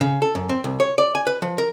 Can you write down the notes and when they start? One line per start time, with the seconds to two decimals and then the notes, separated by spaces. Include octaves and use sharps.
0.01 C#3
0.22 A4
0.35 F#2
0.49 C4
0.64 C2
0.80 C#5
0.98 D5
1.15 G#5
1.27 B4
1.42 F3
1.58 A#4